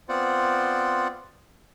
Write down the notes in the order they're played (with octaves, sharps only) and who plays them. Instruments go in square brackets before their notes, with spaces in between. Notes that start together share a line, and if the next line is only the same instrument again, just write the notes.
[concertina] B3 C4 F4 C5 D5 F#5